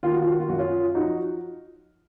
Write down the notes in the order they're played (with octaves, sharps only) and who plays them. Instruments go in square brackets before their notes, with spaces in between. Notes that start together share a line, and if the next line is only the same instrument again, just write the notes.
[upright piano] D#3 F4
F#4
F4
F#4
F4
F#2 F#4
C#4 F4
F3 D#4 F#4